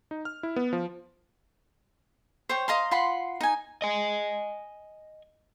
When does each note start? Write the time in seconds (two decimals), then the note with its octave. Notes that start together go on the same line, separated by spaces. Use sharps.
0.11 D#4
0.25 F6
0.43 E4
0.56 B3
0.73 F3
2.49 C5 C#5 G5
2.68 D#5 F5 A#5 C6
2.91 F4 F#5 B5 C6
3.41 D#4 G#5
3.82 D#5 G#5